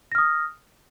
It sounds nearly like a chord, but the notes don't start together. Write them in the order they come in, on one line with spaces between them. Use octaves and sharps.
A#6 F6 D#6